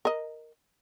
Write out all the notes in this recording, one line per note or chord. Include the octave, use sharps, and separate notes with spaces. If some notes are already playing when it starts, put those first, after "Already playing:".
A#4 D#5